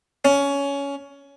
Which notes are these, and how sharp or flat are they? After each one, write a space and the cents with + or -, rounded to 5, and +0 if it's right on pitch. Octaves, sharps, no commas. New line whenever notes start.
C#4 +15